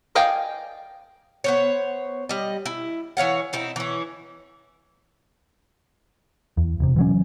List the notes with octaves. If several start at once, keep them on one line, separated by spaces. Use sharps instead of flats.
D5 D#5 F5 G5 G#5
B3 C5 C#5
G3 D#5
E4
E3 C#5 F5 F#5
C4 D#4 E4
E3 C#4
E2
E1 C3
E3 F#3 C#4